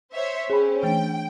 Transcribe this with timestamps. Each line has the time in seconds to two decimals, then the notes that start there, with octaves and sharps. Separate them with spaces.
0.13 C5 C#5 E5
0.50 C4 C#4 G#4 B5
0.83 E3 A3 D4 G5